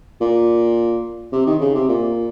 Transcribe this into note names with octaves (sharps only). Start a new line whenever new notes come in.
A#2
C3
D#3
C#3
C3
A#2